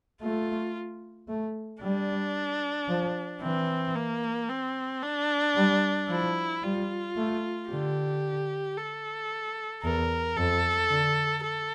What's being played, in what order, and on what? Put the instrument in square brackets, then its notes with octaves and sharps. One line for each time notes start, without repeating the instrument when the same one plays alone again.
[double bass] A3 [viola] F4
[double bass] A3
[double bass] G3 [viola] D4
[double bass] F3
[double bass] E3 [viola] C4
[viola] A#3
C4
D4
[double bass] G3
[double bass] F3 [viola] E4
[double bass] G3 [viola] F4
[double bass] A3
[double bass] D3 [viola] G4
[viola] A4
[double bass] E2 [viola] A#4
[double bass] F2 [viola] A4
[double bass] D3
[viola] A4